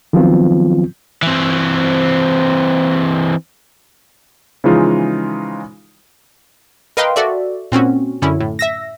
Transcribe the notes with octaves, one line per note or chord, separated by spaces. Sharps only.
D#3 F3 F#3 B3 C4 F4
E3 C4
C#3 E3 F3 G#3 D#4 F4
A#4 B4 D#5 F5 G5 C6
F#4 A4 D5 E5
A#2 C4 C#4 F#4
F#2 D3 C#4 E4
A2
E5 E6 A#6